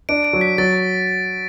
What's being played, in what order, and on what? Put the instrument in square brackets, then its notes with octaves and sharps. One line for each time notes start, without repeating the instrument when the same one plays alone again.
[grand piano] D4 [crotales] D7
[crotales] D7
[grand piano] F#3
[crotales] B6
[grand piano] F#3 [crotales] A6